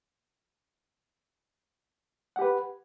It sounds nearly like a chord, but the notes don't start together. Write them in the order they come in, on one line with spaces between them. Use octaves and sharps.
F#5 G4 B4